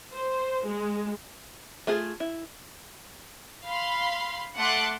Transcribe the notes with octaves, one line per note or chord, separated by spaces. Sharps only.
C5
G#3
A3 F4 G#4
E4
F5 B5 C6
A3 F#5 A5 C6 D6 F#6